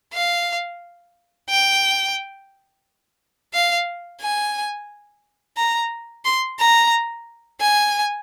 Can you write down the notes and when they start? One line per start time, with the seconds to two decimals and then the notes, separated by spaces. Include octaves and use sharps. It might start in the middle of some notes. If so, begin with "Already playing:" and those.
0.14 F5
1.50 G5
3.54 F5
4.21 G#5
5.57 A#5
6.25 C6
6.60 A#5
7.61 G#5